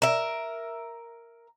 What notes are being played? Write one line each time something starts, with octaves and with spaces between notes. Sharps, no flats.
A#4 E5